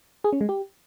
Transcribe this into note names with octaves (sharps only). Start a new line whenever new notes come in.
G#4
C#4
G#3
G4